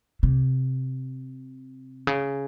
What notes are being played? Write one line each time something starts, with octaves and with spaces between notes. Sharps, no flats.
C3
C#3